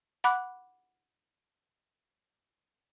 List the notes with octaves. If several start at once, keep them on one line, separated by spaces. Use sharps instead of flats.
F#5 B5 D6 F#6